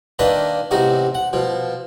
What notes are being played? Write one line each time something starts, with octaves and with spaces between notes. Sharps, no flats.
D#3 A#3 D4 B4 D#5 E5
A1 C3 D#4 F#4 D6
F#5
B2 F3